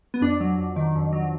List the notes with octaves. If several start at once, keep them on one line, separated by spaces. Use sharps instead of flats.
B3
F2 D4
F#3
F2
D#3
F2
F#3